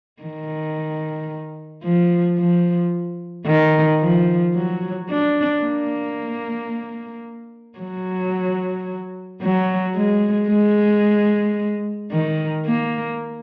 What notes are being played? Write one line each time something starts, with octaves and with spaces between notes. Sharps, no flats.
D#3
F3
F3
D#3
F3
F#3
D4
A#3
F#3
F#3
G#3
G#3
D#3
A#3